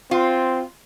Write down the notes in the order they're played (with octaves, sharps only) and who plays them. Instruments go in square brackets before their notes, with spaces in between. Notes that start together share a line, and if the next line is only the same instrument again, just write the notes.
[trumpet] C4 [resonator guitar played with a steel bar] F4